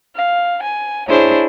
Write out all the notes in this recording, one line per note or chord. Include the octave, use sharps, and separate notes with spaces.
F5
G#5
D4 E4 G#4 C5 C#5